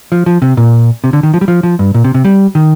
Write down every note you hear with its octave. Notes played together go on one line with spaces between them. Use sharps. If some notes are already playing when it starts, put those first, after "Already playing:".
F3
F3
C3
A#2
C3
D3
D#3
F3
G3
F3
F3
G2
A#2
C3
C3
G3
D#3